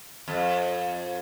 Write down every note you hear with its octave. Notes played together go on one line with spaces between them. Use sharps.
F2